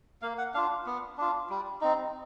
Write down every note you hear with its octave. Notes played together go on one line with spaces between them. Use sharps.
A#3 F5
F#5
D4 F4 F5
B3
D4 F4
G3
C4 D#4